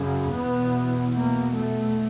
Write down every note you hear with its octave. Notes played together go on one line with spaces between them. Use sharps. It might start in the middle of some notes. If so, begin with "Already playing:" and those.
Already playing: F#2 C#3
E2 B2 B3
A#3
A3